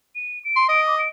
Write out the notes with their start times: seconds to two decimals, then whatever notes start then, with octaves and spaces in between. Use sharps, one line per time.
0.15 D#7
0.44 D7
0.56 C6
0.69 D#5 D7
0.86 D6
0.99 D7